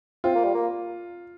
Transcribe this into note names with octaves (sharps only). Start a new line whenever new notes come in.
C4 F4
A#3
G3
A#3